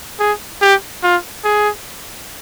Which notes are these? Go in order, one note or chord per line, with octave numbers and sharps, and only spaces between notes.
G#4
G4
F4
G#4